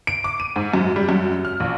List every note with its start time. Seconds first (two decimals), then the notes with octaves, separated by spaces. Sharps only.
0.07 D7
0.24 D6
0.40 D#7
0.56 G#2
0.74 F#2
0.96 G3
1.09 F#2
1.45 F6
1.60 A#1